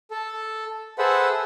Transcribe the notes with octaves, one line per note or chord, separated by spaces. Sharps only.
A4
G#4 A4 B4 C5 E5 F#5